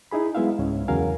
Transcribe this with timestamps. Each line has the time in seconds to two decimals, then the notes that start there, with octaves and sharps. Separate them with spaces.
0.11 D#4 E4 G#4 B5
0.35 F#3 G#3 B3 E4 E5 F5
0.59 C#2 G#2 C#4
0.88 E2 C#3 F#3 A#4 F5 G#5